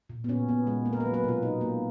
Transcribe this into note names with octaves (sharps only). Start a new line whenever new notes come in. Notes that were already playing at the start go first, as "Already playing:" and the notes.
A#2
B3
A#2 C#4
B3
G#3
A#3
A#4
B4
F#3
B4
B2 F4
B2 D#4
A#3